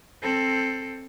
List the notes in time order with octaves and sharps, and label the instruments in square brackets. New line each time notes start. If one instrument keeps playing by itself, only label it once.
[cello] C4 A4